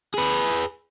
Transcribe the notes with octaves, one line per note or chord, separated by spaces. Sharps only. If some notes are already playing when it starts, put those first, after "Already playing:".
G#4 B4